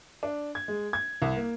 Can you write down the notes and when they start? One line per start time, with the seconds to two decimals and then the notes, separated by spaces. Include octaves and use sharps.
0.23 D4
0.55 G#6
0.68 G#3
0.93 G#6
1.22 C2
1.37 A#3